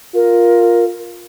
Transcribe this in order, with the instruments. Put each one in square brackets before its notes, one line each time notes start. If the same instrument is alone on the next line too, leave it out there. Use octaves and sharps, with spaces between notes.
[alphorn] F4 [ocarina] A#4